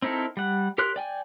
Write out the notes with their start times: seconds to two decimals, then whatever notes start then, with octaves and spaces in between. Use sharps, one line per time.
0.02 C4 D#4 E4 A4 A#4
0.37 G3 F#5
0.78 G4 A#4 C#5 C6 F#6
0.96 D5 G5 G#5